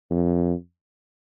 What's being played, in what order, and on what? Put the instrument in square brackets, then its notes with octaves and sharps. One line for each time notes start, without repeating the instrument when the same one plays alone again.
[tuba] F2